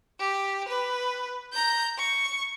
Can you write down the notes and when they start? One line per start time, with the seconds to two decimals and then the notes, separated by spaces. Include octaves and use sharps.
0.20 G4
0.68 B4
1.53 A#5 G6
1.98 C#6